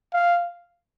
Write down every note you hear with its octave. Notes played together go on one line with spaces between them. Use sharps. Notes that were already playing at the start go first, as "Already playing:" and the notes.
F5